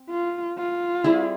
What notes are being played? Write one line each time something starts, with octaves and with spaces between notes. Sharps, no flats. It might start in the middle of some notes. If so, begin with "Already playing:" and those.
Already playing: C4
F4
F4
G3 C4 E4 G#4